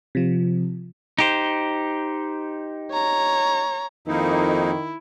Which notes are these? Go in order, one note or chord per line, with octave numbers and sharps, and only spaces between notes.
C3 F3
D#4 G4 C5
C#5 A#5
F2 D#3 A#3 D#4 E4